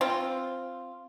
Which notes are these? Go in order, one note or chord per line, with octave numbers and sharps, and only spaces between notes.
C4 F4